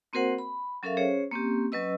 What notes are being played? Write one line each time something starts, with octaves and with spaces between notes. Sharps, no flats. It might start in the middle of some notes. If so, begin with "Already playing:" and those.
A#3 C4 F#4 A#4 C5 F#5
B5
F#3 C#4 A4 A#4 E5 F5
C#4 G#4 C5 C#5
A#3 C4 C#4 G4
F#3 C#4 B4 D#5 E6